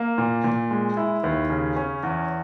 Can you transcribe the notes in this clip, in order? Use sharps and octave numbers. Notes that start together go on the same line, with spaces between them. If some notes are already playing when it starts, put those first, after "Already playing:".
Already playing: A#3
A#2
A#2
G#3
E4
D#2
C#3
C#4
E2